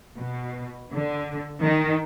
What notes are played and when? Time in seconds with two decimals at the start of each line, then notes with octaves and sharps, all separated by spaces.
0.18 B2
0.93 D3
1.63 D#3